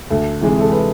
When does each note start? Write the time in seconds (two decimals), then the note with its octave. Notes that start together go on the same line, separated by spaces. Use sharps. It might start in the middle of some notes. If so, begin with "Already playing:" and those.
0.10 D2 A4
0.41 C3 E3 G#3
0.61 A4
0.72 B4